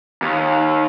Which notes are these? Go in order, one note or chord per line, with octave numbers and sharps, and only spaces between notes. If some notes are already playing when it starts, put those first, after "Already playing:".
D#2